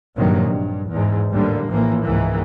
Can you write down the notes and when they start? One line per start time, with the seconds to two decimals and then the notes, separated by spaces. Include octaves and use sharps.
0.17 A#1 G2 C3 D#3 F#3 A#3
0.46 G2
0.91 E2 G#2
1.30 A1 D#2 D3 G3 A#3
1.68 A#1 A2 E3 F3 A#3
2.03 C#2 G#2 E3 A#3